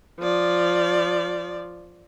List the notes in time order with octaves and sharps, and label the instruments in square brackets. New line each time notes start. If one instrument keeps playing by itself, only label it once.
[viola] F3 D5